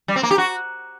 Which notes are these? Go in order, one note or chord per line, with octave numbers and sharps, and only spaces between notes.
G3
C4
A#3
G4
F#4